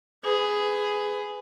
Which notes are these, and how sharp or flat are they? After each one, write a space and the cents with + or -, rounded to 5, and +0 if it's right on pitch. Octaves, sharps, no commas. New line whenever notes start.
G#4 +0 B4 +20